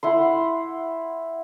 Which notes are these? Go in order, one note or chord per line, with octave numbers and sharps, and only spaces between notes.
E4 F#5 C6